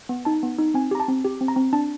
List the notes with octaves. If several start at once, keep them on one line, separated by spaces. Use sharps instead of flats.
B3
D#4 A5
B3
D#4
C4 G#5
G4 A#5
A5
C4
G4
C4
A#5
C4
D4 A5